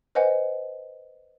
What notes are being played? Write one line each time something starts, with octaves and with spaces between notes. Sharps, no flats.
B4 C5 D#5 F#5 G#5